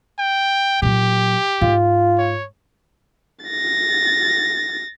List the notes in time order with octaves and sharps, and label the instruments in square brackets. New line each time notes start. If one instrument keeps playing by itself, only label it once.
[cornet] G5
[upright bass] A#2 F#3 [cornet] G4
[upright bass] G#2 [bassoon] F4
[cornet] C#5
[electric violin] A6 A#6